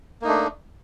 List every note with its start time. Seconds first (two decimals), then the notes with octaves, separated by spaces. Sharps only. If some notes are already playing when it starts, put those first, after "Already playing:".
0.22 A#3
0.24 D#4
0.27 A3
0.29 D4